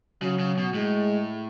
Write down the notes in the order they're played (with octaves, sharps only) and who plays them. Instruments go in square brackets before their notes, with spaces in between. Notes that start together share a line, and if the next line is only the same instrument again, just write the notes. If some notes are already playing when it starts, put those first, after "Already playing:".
[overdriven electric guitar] C#3 [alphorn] F#3
[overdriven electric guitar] C#3
B2
[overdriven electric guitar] A2 [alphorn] G#3